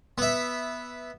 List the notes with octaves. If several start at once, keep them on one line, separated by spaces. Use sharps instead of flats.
B3 E5